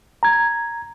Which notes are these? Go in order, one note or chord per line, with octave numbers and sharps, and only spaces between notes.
A#5 G#6